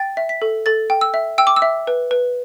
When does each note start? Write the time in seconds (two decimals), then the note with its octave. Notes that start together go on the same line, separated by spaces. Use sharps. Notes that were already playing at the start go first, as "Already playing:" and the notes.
Already playing: G5 A6
0.17 E5
0.29 B6
0.42 A4
0.66 A4 A6
0.90 G5
1.01 E6
1.14 E5
1.38 G5 E6
1.47 D6
1.56 E6
1.62 E5
1.87 B4
2.11 B4